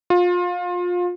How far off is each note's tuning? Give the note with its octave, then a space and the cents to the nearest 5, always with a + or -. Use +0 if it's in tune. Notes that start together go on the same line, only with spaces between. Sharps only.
F4 +25